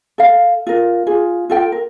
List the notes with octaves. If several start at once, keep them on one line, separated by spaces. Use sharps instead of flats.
A4 F5
F4 A#4
F4 G#4
F4 A4 G5
A#4